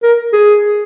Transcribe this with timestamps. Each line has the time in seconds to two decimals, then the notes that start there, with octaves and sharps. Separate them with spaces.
0.03 A#4
0.33 G#4